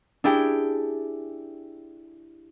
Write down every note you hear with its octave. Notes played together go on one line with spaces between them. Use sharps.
D4 E4 G4 G#4 G5